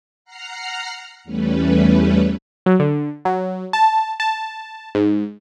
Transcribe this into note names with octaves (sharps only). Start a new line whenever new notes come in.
F#5 A#5 F6 C7
E2 G3 A3 C#4 B4
F#3
D3
F#3
A5
A5
G#2